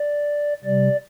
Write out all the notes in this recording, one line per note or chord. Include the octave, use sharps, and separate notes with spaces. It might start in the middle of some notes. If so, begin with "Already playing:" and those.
Already playing: D5
C3 G3 D5